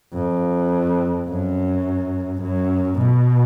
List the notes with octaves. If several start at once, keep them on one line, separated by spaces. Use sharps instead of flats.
F2
F#2
F#2
B2